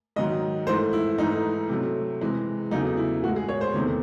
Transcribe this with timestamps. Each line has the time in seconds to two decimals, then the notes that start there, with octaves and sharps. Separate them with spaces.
0.16 G#2 D#3 F#3 D#5
0.67 G#2 E3 A3 C5
0.93 E4
1.18 G#2 E3 A3 D#4
1.69 C3 F#3 A3
2.21 C3 E3 G#3
2.71 E2 C#3 F#3 A3 D#4
2.97 E4
3.23 A2 F#4
3.28 G#3
3.36 G#4
3.49 C#5
3.61 C5
3.74 E2 C3 D#3 A3